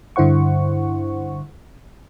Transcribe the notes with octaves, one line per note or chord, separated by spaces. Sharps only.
G2 D3 E4 C5 F#5 C#6